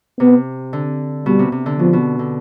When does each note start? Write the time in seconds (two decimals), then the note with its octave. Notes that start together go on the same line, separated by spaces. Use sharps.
0.19 C3 B3
0.73 D3
1.26 B2 G3
1.39 C3
1.52 C3
1.66 D3
1.79 B2 F3
1.93 B2
2.19 D3